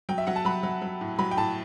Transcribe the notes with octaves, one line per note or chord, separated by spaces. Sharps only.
F#3 G5
E5
F#3 F#5
A5
F#3 B5
F#3
F#3
A2
F#3 B5
G5
A2 A5